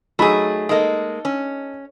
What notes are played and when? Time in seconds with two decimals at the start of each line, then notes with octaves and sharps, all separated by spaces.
0.19 F#3 A3 D#4 G#4 B5
0.69 G#3 A#3 D#4 A4 D#5
1.25 C#4